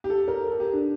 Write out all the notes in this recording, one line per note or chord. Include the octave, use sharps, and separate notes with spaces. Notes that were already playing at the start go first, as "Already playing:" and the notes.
G4
A4
A#4
A4
G4
D4